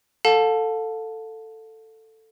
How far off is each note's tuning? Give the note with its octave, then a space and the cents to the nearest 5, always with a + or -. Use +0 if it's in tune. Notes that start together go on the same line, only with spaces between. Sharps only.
A4 +10 F5 +40 A5 +0